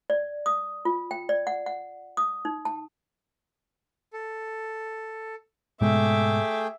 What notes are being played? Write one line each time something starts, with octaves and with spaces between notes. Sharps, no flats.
D5
D#6
F4
G5
D5
F#5
F#5
D#6
D#4
A5
A4
G#2 B2 G#3 A3 G#4 E5 G5 D6